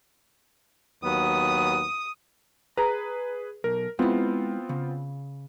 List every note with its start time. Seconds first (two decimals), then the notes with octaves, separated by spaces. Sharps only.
1.04 D#2 F#3 B3 D#6
2.77 G#4 B4 A#5
3.64 B1 A#4
3.99 G#3 B3 C4 E4 F4
4.69 C#3